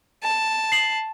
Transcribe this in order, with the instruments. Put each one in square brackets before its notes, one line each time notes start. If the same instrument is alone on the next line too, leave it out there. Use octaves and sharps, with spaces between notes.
[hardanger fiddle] A5
[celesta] C7 F#7